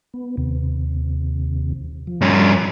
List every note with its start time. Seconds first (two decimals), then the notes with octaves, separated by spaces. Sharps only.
0.14 B3
0.37 D#2 C3
2.07 F3
2.21 G2 C#4